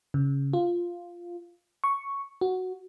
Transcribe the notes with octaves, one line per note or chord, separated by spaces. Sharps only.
C#3
F4
C#6
F#4